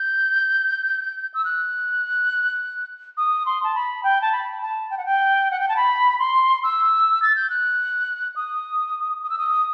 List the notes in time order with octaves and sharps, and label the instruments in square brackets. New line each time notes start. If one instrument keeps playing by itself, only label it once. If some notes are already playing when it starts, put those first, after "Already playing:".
Already playing: [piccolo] G6
E6
F#6
D#6
C6
A5
B5
G5
A5
B5
A5
G5
F#5
G5
F#5
G5
A5
B5
C6
E6
A6
G6
F#6
D#6
D#6
E6
D#6